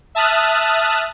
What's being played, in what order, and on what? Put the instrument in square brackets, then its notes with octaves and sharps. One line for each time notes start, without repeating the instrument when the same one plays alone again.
[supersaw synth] E5 A5 D#6 F6 F#6